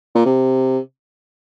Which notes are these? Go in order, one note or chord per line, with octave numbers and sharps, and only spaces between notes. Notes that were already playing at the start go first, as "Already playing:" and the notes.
A#2
C3